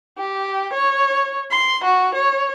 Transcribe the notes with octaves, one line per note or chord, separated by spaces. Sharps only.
G4
C#5
C6
F#4
C#5